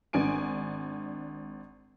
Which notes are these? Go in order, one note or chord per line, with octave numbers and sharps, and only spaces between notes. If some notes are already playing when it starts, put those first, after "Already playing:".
G#1 D4 G#5 D7